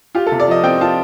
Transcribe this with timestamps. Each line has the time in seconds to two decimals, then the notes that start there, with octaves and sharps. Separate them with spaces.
0.15 F4 G4
0.27 A4
0.32 C3
0.40 D5
0.48 F3 D#5
0.64 C4 G5
0.81 F4 A5